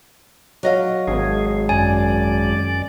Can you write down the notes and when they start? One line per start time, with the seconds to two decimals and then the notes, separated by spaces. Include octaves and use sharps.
0.63 F#3 D#5 F5
1.07 G#1 G#4
1.69 F#2 D5 G#5